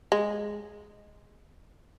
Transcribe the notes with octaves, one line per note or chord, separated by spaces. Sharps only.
G#3